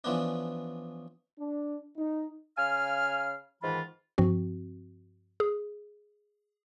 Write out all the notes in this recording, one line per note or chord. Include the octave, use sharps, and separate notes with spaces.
E3 F3 B3 C#4 D4
D4
D#4
C#3 F5 G#5 F6
G#2 D#3 E3 F4 B5
G2 F3 C4 F#4
G#4